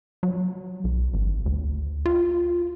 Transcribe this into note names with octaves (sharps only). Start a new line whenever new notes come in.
F#3
B1
G#1
D2
F4